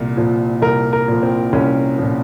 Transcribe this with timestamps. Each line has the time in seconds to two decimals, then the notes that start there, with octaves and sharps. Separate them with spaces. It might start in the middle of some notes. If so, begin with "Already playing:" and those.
Already playing: C2 A#2
0.17 A#2 F3
0.62 C2 A#4
0.93 A#4
1.08 A#2 F3
1.23 C4
1.53 C2 C#4
1.98 A#2 F3